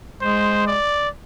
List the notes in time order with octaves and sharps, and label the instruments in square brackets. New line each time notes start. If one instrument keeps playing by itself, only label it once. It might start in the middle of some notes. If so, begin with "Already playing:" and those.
[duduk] G#3 [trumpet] C5
[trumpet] D5